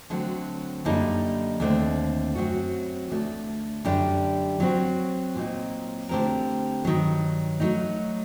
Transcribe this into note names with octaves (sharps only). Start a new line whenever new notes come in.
D3 F#3 A3 C4 F#4
F#2 D3 G3 A#3 D#4
D#2 D3 A3 C4
F#2 F#3 C4 F#4
D2 D3 A3
F#2 D3 G3 D4 G4
F#3 C4 F#4
A#2 F#3 C4 D#4
D3 A3 C4 G4 A#4
G2 D#3 F#3
F#3 A3 D#4 F#4